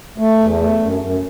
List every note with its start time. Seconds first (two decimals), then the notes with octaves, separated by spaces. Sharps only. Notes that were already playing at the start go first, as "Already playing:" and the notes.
0.18 A3
0.38 E2
0.59 A3
0.79 F#2
0.99 F#2